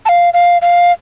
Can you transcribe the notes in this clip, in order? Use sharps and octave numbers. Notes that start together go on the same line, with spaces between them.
A5
F5
F5
F5